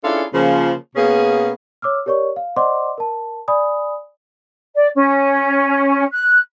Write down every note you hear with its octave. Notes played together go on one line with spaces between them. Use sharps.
C#4 D4 E4 F4 G#4 A4
C#3 F3 A#3
B2 A#3 B3 C#4 G#4
C#5 D6 E6 F6
G4 A#4 C#5 D5 C#6
F5
C5 D5 D#5 F#5 C6 D6
A#4 A5
D5 G#5 B5 D#6
D5
C#4
F#6